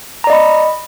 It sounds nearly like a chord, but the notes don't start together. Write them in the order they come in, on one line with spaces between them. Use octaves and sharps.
A#5 D5 D#5 B5